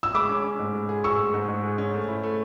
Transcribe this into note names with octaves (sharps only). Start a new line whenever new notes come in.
E6
G#3 B5 D6
C#4
C#4
G#2
G#3
G#4
G#4 C#6 E6
G#3
G#2
G#2
G#4
C#4
A3
E4
A3